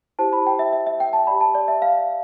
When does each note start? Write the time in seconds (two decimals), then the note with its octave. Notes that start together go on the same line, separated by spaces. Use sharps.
0.19 E4 G4 C5 A5
0.33 B5
0.47 G5
0.59 E5
0.73 E5
0.87 E5
1.00 G5
1.13 A5
1.27 G4 D5 B5
1.41 A5
1.55 D5
1.68 E5
1.82 F5